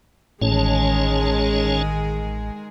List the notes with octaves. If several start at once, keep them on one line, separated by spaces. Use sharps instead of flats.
A1 D#3 G#3 C#4 G#4 C#5 A5